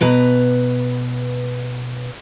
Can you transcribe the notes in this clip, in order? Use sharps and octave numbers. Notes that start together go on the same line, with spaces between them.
B2 B4 A#5